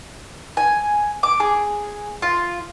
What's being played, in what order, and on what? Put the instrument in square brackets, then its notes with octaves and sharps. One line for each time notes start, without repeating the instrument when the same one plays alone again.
[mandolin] G#5
D6
G#4
F4